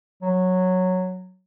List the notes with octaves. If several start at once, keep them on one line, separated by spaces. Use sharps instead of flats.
F#3